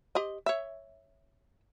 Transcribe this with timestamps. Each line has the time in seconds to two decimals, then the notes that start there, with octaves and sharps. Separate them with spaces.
0.15 G4 C5 D#5
0.46 C#5 E5